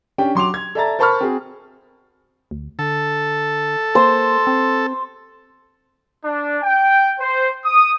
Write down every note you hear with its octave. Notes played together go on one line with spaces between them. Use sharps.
C#4 D4 G4 G5
F#3 C6 D6 F7
G#6
A4 D5 E5 A5 A#5 A6
A#4 C5 A5 B5 C#6 F6
C4 F#4 G#4
D2
D3 A4
A#3 C5
C4
D4
G5
C5
D#6